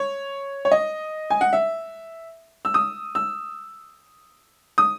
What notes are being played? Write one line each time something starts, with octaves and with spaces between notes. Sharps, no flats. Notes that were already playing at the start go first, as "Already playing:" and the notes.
Already playing: C#5
C#5
D#5
G#5
F#5
E5
E6
D#6
E6
D#6